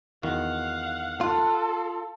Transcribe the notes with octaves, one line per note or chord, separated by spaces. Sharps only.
E2 D#3 F#4 F5 F#5
F4 A4